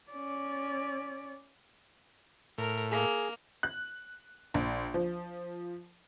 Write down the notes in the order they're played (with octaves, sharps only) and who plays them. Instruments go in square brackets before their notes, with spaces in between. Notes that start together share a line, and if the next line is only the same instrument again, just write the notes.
[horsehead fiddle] C#4 D5
[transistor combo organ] A2 [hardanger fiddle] A#4
[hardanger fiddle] A#3 [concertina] G#4
[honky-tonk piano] F#6
A#1
F3